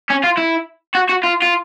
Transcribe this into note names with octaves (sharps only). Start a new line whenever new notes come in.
C#4
F4
E4
F#4
F#4
F4
F4